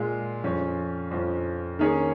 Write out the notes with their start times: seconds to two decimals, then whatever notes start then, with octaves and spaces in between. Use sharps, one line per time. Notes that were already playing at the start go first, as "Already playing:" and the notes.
Already playing: A#2 G#3 F4
0.44 F2 F3 C#4
1.11 F2 F3 C#4
1.79 D#3 A#3 C#4 G#4 C#5